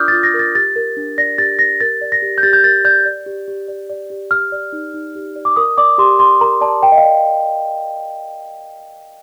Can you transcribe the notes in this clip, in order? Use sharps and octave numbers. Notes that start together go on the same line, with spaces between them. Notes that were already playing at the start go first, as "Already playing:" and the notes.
Already playing: D4 F4 A#4 D5 D6 D#6 F6 G6
A6
F4
A#6
A#4
A6
G4 A6
A#4
D4
D5 A#6
G4 A6
A#4 A#6
A#4 A6
D5
A#6
G4
G6
G4 A6
G6
A#4 A6
D5 G6
D5
G4
G4
D5
D5
G4
G4 F6
D5
D#4
D#4
G4
D5
D6
A#4 D#6
D5 D6
G4 C6
G4 C6
A#4 A#5
D5 A5
A#4 G5
D#5
F5
D5